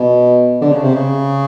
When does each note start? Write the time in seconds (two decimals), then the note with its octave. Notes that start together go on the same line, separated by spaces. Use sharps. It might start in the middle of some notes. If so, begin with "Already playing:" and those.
Already playing: B2
0.61 D3
0.71 C#3
0.83 C3
0.94 C#3